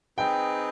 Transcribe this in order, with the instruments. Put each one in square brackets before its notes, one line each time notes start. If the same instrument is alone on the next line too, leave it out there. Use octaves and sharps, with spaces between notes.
[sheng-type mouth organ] C4 D#4 G#4 B4 [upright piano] G5